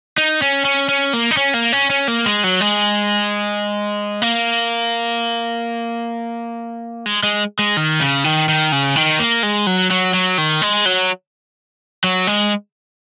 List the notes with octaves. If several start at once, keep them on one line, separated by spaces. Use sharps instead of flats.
D#4
C#4
C#4
C#4
A#3
D#4
C#4
A#3
C#4
C#4
A#3
G#3
F#3
G#3
A#3
G#3
G#3
G#3
D#3
C#3
D#3
D#3
C#3
D#3
A#3
G#3
F#3
F#3
F#3
D#3
G#3
F#3
F#3
G#3